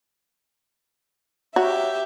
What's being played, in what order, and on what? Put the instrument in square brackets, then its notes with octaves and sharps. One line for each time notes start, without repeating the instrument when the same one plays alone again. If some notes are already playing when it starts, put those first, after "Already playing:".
[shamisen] F#4 C#5 [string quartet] G4 E5